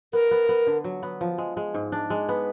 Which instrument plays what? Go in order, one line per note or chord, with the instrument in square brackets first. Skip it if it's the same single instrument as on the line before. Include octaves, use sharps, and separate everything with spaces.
[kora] B3 [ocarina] A#4
[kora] B3
B3
D3
F#3
B3
F3
G#3
G#3
G#2
D4
G#3
[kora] B3 [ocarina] B4